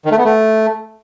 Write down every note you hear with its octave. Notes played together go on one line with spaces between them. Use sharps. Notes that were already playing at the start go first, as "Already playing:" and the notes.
D#3
A3
B3
A3